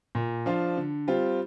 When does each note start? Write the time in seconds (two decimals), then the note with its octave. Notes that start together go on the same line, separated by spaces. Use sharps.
0.15 A#2
0.46 F3 D4 F4
0.77 D3
1.08 G3 C4 F4